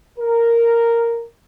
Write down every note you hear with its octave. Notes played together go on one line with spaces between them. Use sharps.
A#4